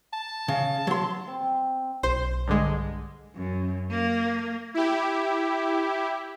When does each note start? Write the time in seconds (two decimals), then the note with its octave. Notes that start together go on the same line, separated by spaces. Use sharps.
0.13 A5
0.48 C#3
0.87 F#3 C6
1.28 C4
2.03 B1 C5
2.48 G2 D3 G#3
3.36 F#2
3.90 A#3
4.74 E4 G4